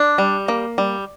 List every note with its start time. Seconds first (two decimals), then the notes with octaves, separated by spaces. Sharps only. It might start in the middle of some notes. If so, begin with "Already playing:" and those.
Already playing: D4
0.18 G3
0.48 A#3
0.78 G3